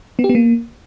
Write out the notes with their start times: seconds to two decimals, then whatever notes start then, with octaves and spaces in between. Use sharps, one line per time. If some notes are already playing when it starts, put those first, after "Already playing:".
0.19 B3
0.24 G4
0.29 B3
0.35 A#3